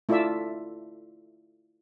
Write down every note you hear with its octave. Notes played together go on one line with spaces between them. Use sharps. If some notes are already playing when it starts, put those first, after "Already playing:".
A3 E4 F4 D5 E5